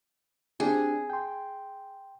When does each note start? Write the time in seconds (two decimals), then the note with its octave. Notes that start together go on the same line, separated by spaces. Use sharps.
0.60 C4 D4 G4 G#4
1.10 G5 C6